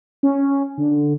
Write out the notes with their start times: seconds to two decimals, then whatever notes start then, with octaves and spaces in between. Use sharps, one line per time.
0.23 C#4
0.77 D3